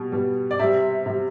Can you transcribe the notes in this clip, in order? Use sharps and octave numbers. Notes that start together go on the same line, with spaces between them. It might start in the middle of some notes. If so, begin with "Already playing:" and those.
Already playing: B2 G3
B2 G3
D5
C3 G3 E5
C3 G3